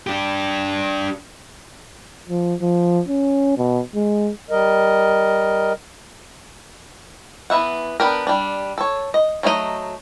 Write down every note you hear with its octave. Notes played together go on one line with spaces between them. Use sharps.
D4 G4
F3
F3
C#4
B2
G#3
G3 A#4 D#5
E3 B3 E5 F#5
B3 D4 G4 A#4
G3 D4
A4 C#5
D#5
F#3 A3 D#4 E4 D#5